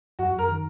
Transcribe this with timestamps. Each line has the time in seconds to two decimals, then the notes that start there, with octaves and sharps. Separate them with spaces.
0.19 F#2 F#4
0.33 F#2
0.38 A#4
0.48 D#3